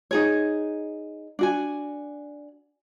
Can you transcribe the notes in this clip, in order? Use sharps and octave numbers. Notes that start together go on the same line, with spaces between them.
D#4 G#4 C#5
D4 F#4 G#5